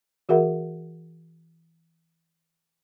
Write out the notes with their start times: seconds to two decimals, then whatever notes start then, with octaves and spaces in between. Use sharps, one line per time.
0.29 E3 F#4 G#4 A#4 E5 F#5